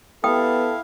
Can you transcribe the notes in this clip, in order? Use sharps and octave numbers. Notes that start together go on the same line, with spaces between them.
B3 E4 G4 A4 F5 G5 D#6